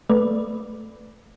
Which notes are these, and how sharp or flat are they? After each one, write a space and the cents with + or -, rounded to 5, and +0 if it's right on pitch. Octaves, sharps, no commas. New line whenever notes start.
A3 +0 B4 +0 D5 +0